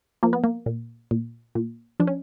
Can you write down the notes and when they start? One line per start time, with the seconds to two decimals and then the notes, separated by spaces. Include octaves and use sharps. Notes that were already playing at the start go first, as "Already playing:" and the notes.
0.23 F3 A#3
0.33 B3
0.44 A#3
0.66 A#2
1.11 A#2
1.55 A#2
2.00 F3 D4
2.07 C#4